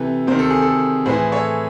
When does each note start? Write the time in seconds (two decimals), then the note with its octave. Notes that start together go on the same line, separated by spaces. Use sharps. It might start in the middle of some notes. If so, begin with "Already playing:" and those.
Already playing: C3 E3 A4
0.27 C3 D#3 C5
0.39 A4
0.50 G#4
0.62 A4
1.06 A2 E3 G#4 C5
1.32 A4 C#5